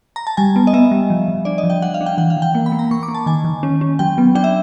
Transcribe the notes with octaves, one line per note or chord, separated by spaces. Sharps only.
A#5
A5
G3 G#5
B3
D#5
B3 E5
G3
F3
F3
D4 D5
D#5
F3
G5
D4 F#5
F5
D4
G5
E3 F#5
F5
E3
G5
A#3
B5
A#3
A#5
A#3 C#6
D6
A#3
A5
D#3 G#5
D#3
C#4
C#4
F#3 G5
B3
D4 G5
E5